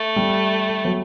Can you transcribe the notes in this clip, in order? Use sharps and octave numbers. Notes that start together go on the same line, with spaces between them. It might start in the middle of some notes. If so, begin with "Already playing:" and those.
Already playing: A3
G3
F#3